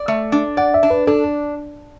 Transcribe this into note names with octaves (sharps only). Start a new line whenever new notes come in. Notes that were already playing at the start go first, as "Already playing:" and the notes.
Already playing: D5
A3
D4
D5 F#5
E5
D4
B4
D4 A4